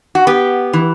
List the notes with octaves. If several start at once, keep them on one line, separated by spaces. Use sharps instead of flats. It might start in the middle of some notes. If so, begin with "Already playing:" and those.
F#4
B3 G4
E3